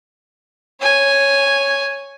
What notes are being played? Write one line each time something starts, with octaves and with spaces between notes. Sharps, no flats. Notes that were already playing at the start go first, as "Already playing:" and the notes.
C#5 G#5